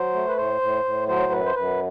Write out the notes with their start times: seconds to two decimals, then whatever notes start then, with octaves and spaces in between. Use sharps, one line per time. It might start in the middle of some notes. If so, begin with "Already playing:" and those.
Already playing: F#3 C5
0.14 A3
0.28 B4
0.37 A2 C5
0.61 A2
0.85 A2
1.08 F#3 C5
1.32 F#2 B4
1.46 C5
1.55 F#2 B4